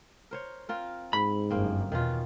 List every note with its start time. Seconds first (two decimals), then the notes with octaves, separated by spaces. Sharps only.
0.31 A#4 C5 C#5
0.69 C4 F4 A#4
1.13 G#2 B5
1.50 G1 F#2 A#3 C4
1.92 E2 B2 D#3 C#4 F4